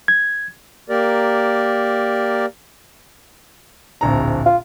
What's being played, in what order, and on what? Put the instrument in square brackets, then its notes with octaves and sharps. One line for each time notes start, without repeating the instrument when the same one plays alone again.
[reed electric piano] G#6
[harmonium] A#3 G4 A#4 D5
[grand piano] D1 A#1 A#5
[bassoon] F4